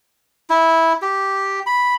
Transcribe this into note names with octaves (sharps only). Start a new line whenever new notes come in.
E4
G4
B5